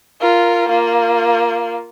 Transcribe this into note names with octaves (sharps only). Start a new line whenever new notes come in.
F4 A#4
A#3 F4